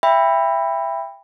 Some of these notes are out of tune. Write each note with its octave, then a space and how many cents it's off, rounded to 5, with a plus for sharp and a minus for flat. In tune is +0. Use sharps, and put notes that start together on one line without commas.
E5 +15 G5 +25 B5 +0